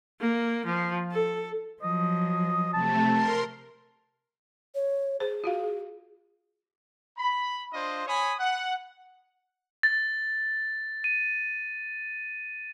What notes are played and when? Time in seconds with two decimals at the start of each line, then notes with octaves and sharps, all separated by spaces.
0.20 A#3
0.66 F3
1.12 A4
1.83 F3 F#3 D#5
2.73 C3 A3 A5
3.13 A#4 C6
4.75 C#5
5.20 G#4 C5
5.44 F4 F#4 F5
7.18 B5
7.73 D4 F4 C5 D#5
8.07 C#5 G#5 B5 D#6
8.40 F#5
9.83 A6
11.04 D#7